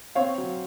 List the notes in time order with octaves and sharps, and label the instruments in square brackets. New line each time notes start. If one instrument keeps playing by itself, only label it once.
[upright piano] C4 C#5 F5
F#3